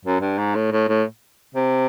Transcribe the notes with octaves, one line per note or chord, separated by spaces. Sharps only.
F#2
G2
G#2
A2
A2
A2
C3